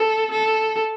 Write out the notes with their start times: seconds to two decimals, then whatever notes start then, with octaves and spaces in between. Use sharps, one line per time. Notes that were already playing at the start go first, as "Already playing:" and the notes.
Already playing: A4
0.31 A4